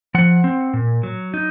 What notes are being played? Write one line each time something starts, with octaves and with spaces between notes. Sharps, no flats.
F3 F#5
C4
A#2
F#3
D#4